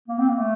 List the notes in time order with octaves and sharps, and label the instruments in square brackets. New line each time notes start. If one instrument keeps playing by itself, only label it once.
[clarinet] A#3
C4
A#3
A3